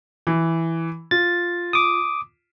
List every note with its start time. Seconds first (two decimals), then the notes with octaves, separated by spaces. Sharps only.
0.27 E3
1.11 F4 A6
1.73 D6 D#6